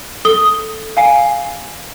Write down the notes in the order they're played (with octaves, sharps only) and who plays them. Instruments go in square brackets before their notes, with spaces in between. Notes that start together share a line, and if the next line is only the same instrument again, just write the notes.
[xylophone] A4 D#6 G7
F5 G#5 C7